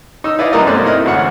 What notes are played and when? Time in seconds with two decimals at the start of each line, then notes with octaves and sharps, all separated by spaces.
0.24 D#4 E6
0.39 E4 B4 D5 D#5 F5
0.53 F#2 A#3 G4 A#4 D#5
0.67 G2 B2 A3 C4 D5 F#6
0.83 A#3 D#4 E4 D#5 F6
1.05 A1 D2 G#2 F#4 F#5